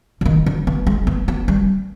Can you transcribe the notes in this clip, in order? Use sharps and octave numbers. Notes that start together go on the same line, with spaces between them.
D3
D#3
D3
B3
G#3
B3
B3
G3